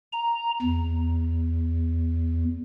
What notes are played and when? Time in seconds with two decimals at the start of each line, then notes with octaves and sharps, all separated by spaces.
0.12 A#5
0.62 E2